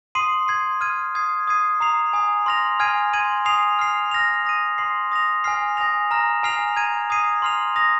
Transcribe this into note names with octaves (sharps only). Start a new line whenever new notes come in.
C6 D#6 C7 D#7
C6 G#6 C7
F6 G#6 D#7
D#6 G#6 C7
D#6 G#6 C7 D#7
A#5 D#6 C7 F7
G#5 D#6 C7
C6 F6 A#6 F7
G#5 F6 G#6 C7 D#7
C6 G#6 D#7
G#5 D#6 C7 F7
F6 C7 F7
F6 A#6 F7
D#6 A#6 D#7
C6 D#6 C7
D#6 A#6 F7
G#5 F6 C7
G#5 D#6 A#6 F7
A#5 F6 A#6
G#5 F6 C7 F7
A#5 G#6 D#7
D#6 G#6 C7 D#7
C6 F6 C7 F7
D#6 A#6 F7